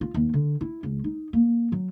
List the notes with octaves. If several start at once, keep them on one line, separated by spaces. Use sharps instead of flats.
F4
D#2
D3
E4
C#2
D#4
A#3
F#3